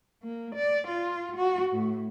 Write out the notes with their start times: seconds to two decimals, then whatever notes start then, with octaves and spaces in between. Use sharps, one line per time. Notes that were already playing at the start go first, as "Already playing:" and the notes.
0.23 A#3
0.55 D5
0.88 F4
1.36 F#4
1.72 A2